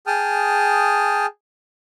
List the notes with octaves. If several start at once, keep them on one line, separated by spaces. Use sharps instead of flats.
G#4 G5 A5 D#6 F6